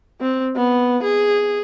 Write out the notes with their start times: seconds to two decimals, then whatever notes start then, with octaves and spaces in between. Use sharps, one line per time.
0.20 C4
0.56 B3
1.03 G#4